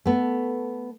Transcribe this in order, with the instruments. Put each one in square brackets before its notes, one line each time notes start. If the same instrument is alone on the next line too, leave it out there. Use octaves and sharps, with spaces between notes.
[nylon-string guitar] A3 B3